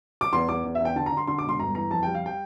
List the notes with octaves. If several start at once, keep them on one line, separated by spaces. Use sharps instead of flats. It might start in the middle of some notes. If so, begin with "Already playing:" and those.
D6
E2 C6
E2 D6
E2
E5
E2 G5
D3 A5
A#5
D3
C6
D3 C6
D6
E1
C6
G1 A#5
E3 A#5
F2 A5
G3 G5
F5
G5